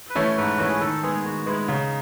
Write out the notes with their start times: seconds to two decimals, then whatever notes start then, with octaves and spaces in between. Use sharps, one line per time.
0.10 B4
0.15 E3 A3 C#4 E4 A4
0.37 G#2 B4
0.57 E3 A3 C#4 E4 F#4
0.69 G#4
0.81 D#3 A4
1.02 G#3 B3 G#4
1.25 D#3 F#4
1.46 G#3 B3 E4
1.62 E4
1.68 C#3 D#4